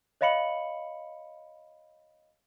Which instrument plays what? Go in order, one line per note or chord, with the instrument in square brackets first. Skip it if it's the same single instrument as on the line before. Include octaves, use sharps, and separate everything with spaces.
[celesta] C#5 D#5 F5 B5 C#7 F#7